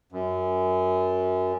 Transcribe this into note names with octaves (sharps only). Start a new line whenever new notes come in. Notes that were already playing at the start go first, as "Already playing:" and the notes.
F#2